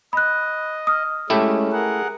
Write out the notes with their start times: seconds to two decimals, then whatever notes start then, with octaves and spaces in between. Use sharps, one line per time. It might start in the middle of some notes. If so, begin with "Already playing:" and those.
0.13 D#5 B5 F#6
0.87 D#6 F6
1.30 G#3 A3 C#4 E4 G4
1.73 G#4 A#4 F#5